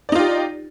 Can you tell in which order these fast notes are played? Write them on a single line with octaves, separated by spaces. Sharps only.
D5 D#4 F4 G4